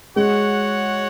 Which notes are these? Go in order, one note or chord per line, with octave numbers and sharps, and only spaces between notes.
G#3 F#4 C#5 F#5